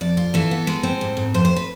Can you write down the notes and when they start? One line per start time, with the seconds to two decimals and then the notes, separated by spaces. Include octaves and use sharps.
0.01 F2 D5
0.17 F4
0.34 E3 A4
0.51 B3
0.67 G#3
0.83 C4
1.01 G#2
1.17 G#2
1.34 F2 C5
1.45 C5
1.56 B4